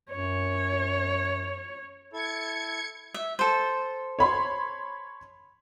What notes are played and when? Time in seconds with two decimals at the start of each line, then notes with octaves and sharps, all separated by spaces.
0.10 F#2 C#5
2.13 E4 A4 G#6 C#7
3.14 E5
3.39 A4 C5
4.19 C#5 B5 C6